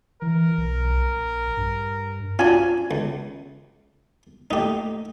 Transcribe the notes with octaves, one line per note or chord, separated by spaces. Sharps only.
E3 A#4
B1
A#1
G2
C#4 D4 F4 F#4 G#5
C#2
A3 A#3 D#4 G4 D#5